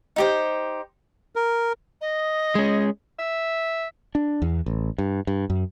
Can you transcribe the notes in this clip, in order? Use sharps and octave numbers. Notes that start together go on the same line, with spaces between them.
D#4 G4 C5
A#4
D#5
G#3 C#4
E5
D4
E2
A1
G2
G2
F#2